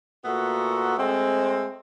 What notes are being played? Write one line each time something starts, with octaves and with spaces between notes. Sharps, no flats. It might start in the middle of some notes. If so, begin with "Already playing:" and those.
A#2 A3 B3 F#4
G#3 A3 C4